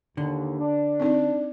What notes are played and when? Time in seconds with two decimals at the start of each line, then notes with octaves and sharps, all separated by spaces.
0.17 D#2 D3
0.59 D4
1.00 C4 D#4 D5